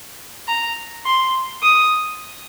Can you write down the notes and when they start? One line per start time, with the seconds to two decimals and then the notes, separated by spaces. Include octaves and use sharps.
0.48 A#5
1.05 C6
1.63 D#6